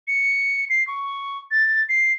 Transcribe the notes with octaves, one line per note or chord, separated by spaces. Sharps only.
C#7
C7
C#6
A6
C7